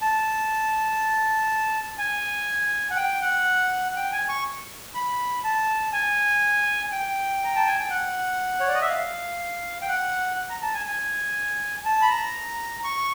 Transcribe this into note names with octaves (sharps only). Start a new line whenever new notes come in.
A5
G#5
F#5
G5
F#5
G5
G#5
C#6
B5
A5
G#5
G5
A#5
A5
G#5
G5
F#5
C#5
D5
D#5
E5
F5
G5
F#5
A#5
A5
G#5
G#5
A5
B5
A#5
C#6